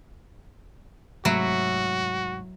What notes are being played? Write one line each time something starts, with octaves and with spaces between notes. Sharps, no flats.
G#2 C3 F#3 A3 E4 F#4